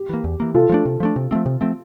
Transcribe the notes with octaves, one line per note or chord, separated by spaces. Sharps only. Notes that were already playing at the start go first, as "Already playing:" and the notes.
Already playing: G4
E3 A#3
E2
E3 A#3
C3 F4 A4
F3 A3 D4
C3
F3 A3 D4
C3
F3 A3 C4
C3
F3 A3 C4